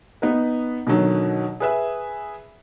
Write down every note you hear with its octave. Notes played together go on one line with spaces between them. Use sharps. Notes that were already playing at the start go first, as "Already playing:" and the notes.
B3 D#4 B4
B2 D3 D#3 F#3
G#4 B4 E5